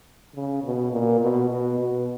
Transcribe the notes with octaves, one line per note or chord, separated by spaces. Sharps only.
C#3
B2
A#2
B2
B2
B2